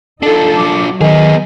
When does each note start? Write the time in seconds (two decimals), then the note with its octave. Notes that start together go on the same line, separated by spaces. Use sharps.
0.23 D4 D#4 F4 A4
0.57 F#3 D6
1.01 D#3 B3 G#4 D#5